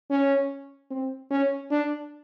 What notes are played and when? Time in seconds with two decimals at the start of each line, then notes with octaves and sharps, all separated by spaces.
0.10 C#4
0.90 C4
1.30 C#4
1.71 D4